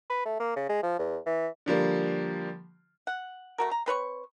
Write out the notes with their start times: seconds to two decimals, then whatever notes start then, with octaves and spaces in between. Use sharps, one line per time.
0.10 B4
0.25 A3
0.40 A#3
0.56 C#3
0.69 G#3
0.83 F3
0.99 E2
1.26 E3
1.66 D3 F3 G3 A#3
3.07 F#5
3.58 A3 F#4 A#4
3.71 A#5
3.86 C4 B4 C#5 C#6